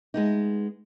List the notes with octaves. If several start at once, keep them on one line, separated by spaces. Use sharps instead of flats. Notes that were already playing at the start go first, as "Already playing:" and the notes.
G#3 B3 D#4